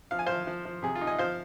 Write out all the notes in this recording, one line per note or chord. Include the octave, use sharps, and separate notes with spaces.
F3 F5
G#5
F3 C5 F5
F3
F3
C3 G#4
F4
D#4
D#5 G#5
F3 C5 F5